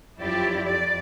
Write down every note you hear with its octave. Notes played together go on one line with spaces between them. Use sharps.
F#2 F3 E4 G4 D5
F2 D5